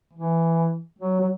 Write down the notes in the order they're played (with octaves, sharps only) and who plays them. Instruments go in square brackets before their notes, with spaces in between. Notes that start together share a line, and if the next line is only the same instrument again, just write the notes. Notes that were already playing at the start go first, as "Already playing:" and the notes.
[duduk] E3
F#3
F#3